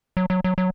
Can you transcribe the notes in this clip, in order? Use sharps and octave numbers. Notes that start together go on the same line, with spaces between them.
F#3
F#3
F#3
F#3